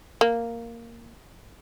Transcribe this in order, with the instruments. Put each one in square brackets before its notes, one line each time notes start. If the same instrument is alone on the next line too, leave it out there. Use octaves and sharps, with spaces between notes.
[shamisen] A#3